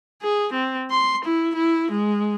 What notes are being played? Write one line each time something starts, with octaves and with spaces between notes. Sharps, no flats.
G#4
C4
C6
E4
E4
G#3